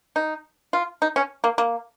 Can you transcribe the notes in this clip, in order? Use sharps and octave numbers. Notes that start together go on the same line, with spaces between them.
D#4
F4
D#4
C#4
A#3
A#3